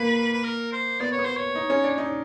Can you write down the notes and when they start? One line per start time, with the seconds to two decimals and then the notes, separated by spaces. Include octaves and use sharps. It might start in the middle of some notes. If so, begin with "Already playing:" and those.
Already playing: A#3 B4
0.33 B4
0.44 A#4
0.73 C5
1.00 B3 D5
1.12 C#5
1.19 B3
1.25 C5
1.37 C#5
1.55 D#4
1.70 C#4
1.84 D4
1.98 D#4